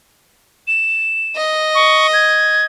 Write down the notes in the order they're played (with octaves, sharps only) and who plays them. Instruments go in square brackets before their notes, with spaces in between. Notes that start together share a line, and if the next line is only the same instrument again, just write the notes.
[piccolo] E7
[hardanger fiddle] D#5
[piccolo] C#6
G#6